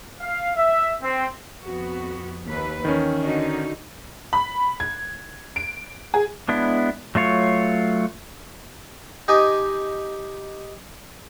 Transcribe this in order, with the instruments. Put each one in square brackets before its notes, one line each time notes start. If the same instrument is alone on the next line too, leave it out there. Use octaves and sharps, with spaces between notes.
[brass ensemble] F5
E5
C4
[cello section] F2 B3 F#4
D#2 B4
[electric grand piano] D#3 C#4 [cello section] E3
[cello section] D3 D#4 F#4
[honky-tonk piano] B5
G#6
D7
G#4
[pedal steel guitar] G#3 B3 D4 E4
F#3 A3 F4 C#5
[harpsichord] D#4 G4 D#5 G#5